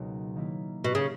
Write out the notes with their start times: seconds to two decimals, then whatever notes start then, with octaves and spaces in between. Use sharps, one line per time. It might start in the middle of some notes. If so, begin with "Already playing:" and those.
Already playing: C#2 B2 F#3 A#3 D#4
0.36 D#3 A#3 E4
0.84 B2
0.95 C#3